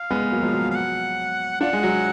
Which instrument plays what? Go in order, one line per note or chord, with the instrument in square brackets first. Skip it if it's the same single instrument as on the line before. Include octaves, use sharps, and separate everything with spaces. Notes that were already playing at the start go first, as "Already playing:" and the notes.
Already playing: [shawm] F5
[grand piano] G#3 B3
F#3 A#3
F3 G#3
F#3
F#3
[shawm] F5
F#5
[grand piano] D4 F4 [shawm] F#5
[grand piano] G#3
F#3